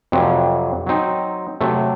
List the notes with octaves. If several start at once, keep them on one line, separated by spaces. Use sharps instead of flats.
F2 C3 F#3
F#3 C4 D#4
C3 F#3 A3